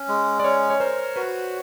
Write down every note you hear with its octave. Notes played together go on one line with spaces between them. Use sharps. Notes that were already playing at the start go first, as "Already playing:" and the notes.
Already playing: C#4
G#3
D5
C#4 C#5
C#5
A#4 C5
F#4 B4